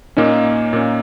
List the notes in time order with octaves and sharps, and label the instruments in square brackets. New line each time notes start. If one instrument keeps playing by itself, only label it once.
[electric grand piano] A#2 A#3 C#4 [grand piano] D#4
[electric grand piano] A#2 A#3 C#4